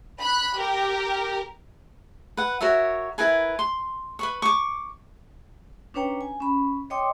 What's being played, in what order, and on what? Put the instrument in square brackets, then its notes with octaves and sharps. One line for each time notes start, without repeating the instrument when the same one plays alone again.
[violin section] B5 F#6
G4 A#4
[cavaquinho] B4 F#5
F#4 A#4 C#5 E5
E4 A#4 B4 G#5
C6
B4 B5 C#6
C#6 D6
[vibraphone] C#4 D4 B4 C#5 G5 A#5
G#5
C#4 B5
C#5 D#5 G5 C6 D6 D#6